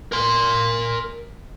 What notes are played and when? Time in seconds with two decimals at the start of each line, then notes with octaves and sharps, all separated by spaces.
0.12 A#4 C6